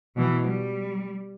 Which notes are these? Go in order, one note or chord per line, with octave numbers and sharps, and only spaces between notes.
B2 E3
G3